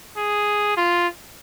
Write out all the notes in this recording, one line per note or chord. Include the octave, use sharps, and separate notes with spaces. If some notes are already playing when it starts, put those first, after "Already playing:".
G#4
F4